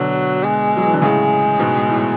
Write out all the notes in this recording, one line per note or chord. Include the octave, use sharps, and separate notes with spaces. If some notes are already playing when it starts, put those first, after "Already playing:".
Already playing: B2 D3 F#3
G#3
F#3
E3
D3
A2 C#3 G#3
G#2 B2
A2